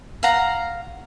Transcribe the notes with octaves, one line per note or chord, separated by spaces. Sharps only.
F5 F#5 A#5